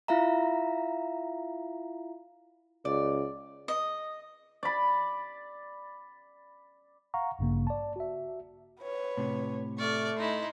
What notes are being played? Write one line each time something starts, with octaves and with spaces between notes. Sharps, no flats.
E4 F4 E5 F5 A#5
C#2 D5
D#5
D5 B5
F5 F#5 A#5 C#6
A1 G2 C#3 A#3
D5 A5
F#4 E5
B4 C#5
A2 C3
A3 D5 C#6 F6
D#4 E4 C6